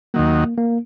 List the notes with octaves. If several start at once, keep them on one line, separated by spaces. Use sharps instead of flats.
D#2 D#3 F#3 A#3
A#3